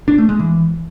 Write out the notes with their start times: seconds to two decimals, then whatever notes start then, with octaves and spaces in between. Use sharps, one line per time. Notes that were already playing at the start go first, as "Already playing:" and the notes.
0.08 D4
0.18 A3
0.29 G#3
0.39 E3